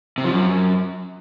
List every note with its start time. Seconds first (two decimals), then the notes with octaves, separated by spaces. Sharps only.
0.18 C3
0.25 F3
0.31 F#2